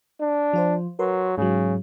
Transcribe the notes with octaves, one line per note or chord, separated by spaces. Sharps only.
D4
F3 F4 C5
F#3 A#4 B4 C6
G#2 C#3 F#3